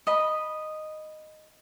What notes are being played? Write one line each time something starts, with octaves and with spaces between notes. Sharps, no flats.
D#5 B5